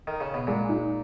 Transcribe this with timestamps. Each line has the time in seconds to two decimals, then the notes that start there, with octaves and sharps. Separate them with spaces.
0.07 D#3
0.20 C#3
0.34 B2
0.47 A#2 G#3
0.69 D#4